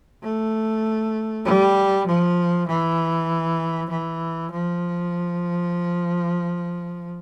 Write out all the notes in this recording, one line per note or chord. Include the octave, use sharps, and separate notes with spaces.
A3
G3
F3
E3
E3
F3